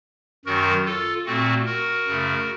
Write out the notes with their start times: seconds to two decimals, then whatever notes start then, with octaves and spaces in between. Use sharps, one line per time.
0.46 F#2 D#3 F#3 F#4 A#4
0.86 F4 A4
1.26 A#2 A3 C4 F#4
1.66 F#4 A#4
2.07 F#2 C#3 A3